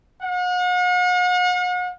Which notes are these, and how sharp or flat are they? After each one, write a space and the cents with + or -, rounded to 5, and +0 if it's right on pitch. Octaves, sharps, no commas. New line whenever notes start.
F#5 -45